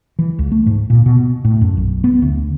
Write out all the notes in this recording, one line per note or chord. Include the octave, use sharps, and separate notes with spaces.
E3
C#2
A3
G#2
A#2
B2
A2
F#2
B1
B3
D2